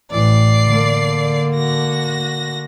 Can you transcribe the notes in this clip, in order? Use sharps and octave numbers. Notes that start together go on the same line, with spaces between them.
A1 E3 D5 C7
D3 A#3
F#4 A#6